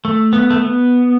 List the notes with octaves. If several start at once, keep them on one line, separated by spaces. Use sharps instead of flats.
A3
B3
A3
B3